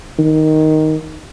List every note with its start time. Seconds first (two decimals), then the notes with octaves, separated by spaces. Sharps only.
0.19 D#3